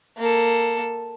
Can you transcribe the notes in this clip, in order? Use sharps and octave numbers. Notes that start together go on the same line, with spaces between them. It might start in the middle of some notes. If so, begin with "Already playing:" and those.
A#3 A4